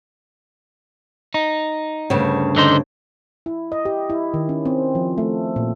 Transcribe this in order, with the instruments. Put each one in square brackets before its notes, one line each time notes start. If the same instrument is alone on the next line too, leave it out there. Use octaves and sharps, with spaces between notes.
[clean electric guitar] D#4
[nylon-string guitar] D2 G2 C#3
[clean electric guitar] D3 D#4 C5
[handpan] E4
D#5
G4
E4
D#3
C#4
C4
F3
A3
A#2